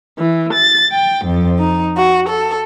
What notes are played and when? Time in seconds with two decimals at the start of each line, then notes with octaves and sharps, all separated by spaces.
0.17 E3
0.52 A6
0.92 G5
1.25 F2
1.62 D#4
1.97 F#4
2.30 A4